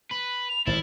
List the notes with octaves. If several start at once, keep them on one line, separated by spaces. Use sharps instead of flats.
B4
F7
G#1 A2 F3 E4 A6